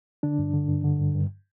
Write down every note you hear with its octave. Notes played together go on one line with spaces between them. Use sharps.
D3 D4
G2
D3
G2
D3
G2
G2